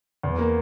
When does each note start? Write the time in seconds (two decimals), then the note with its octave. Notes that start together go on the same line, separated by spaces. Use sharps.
0.23 E2
0.38 A#3